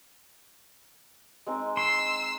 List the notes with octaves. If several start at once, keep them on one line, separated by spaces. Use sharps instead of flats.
G#3 C4 D#4
C6 E6 C7